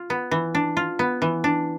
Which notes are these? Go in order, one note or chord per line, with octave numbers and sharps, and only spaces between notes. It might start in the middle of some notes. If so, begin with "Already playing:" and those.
Already playing: F4
B3
E3
D4
F4
B3
E3
D4